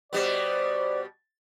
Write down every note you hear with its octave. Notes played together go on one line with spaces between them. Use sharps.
B2 G3 B3 C5 D5